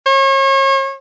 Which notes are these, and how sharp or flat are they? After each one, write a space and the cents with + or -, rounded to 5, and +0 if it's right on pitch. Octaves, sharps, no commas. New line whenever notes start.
C#5 -35